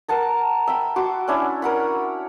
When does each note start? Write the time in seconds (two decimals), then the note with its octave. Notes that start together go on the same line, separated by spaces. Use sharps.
0.08 A#4 F#5 A5 A#5
0.67 E5 G5 B5
0.96 F#4 C6 D6
1.28 C#4 D4 E4
1.62 A#4 F#5 B5